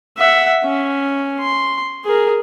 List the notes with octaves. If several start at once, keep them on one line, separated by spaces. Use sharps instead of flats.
E5 F#5
C#4
C6
G#4 A#4